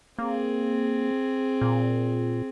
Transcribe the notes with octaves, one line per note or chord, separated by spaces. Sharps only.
A#3 C4 G#4
A#2